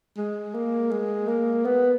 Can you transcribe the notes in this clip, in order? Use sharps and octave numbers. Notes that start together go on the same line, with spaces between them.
G#3
A#3
G#3
A#3
B3